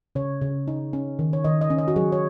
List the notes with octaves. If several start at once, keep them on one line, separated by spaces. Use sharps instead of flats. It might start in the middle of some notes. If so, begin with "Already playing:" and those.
C#3 C#5
C#3
D#4
C#4
D#3
C#5
D#3 D#5
D#5
C#4
D#5
F#4
F#3 G#4
C#5